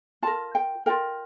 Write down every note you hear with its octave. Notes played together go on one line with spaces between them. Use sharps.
F4 A#4 A5
G5
F4 A#4 G5